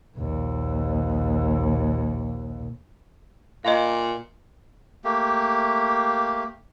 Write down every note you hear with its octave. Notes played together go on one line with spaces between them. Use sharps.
A#1 D#2
A#2 D#5 F5
A3 A#3 G4